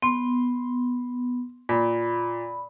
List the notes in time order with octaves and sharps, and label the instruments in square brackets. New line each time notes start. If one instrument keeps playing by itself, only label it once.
[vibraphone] B3 [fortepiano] C6
[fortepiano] A#2 [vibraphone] B5